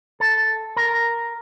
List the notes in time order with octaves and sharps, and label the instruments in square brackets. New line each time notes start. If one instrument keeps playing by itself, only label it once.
[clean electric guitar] A4
A#4